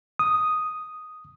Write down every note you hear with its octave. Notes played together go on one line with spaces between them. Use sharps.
D#6